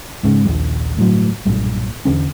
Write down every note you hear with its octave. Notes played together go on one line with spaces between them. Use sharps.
G#2 C#3
A#1 D#2 A#2
G1 A2 F#3
B1 G2 A#2
E2 D3 C#4